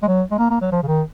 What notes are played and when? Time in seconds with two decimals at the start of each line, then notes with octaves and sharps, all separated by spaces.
0.03 G#3
0.08 F#3
0.31 G#3
0.39 A#3
0.51 A#3
0.62 F#3
0.72 F3
0.83 C#3
0.88 D#3